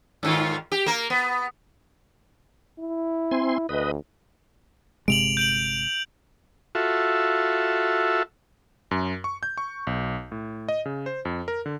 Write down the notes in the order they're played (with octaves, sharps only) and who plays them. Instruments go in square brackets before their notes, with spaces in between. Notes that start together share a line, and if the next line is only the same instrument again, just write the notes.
[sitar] G#2 D#3 F4
G4
A#3 A#4
B3
[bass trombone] E4
[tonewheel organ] C4 G#5 C6
[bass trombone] D2 [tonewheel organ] B4 D#5
[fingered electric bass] G1 C3 G#3 [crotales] D7 F7 F#7
[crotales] G6 D7 F#7
[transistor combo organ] F4 F#4 A4 E5
[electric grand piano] F#2
C#6
G6
C#6
B1
A2
D#5
C#3
C5
F2
A#4
D3